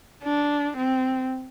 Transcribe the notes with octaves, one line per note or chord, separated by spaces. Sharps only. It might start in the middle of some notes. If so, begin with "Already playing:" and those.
D4
C4